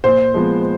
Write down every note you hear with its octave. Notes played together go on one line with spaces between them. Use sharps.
A#2 C5
F3 G#3 B3